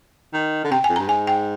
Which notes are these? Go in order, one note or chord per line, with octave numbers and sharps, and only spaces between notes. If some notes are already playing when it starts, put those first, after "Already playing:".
D#3
D3
C3 G5
G#5
F2
G2 A#5
G#2 G#5
G5